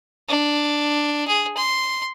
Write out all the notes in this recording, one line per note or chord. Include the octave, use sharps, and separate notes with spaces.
D4
G#4
C6